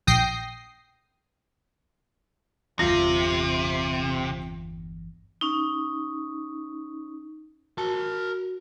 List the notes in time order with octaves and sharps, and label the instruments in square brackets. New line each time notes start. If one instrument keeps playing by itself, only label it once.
[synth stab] A#1 G5 D#6 G6 A#6 C7
[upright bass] G1 E2 [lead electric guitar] C3 [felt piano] F4 A#6
[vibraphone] C#4 D#4
[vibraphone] F#4 [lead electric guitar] A#4 A5